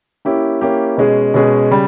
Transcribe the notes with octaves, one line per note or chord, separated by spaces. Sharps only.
A#3 C#4 E4 G4
A#3 C#4 E4 G4
B2 G#3 C#4 G#4
B2 G#3 C#4 G#4
C#3 G3